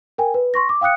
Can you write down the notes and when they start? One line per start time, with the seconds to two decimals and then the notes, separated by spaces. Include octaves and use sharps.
0.18 A#4 G5 G#5
0.34 B4
0.54 C6 C#6 A#6
0.69 D6
0.81 F5 G5 D#6 F#6 C#7